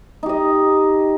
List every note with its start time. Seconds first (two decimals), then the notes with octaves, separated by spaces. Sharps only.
0.23 D#4
0.26 G4
0.29 D#5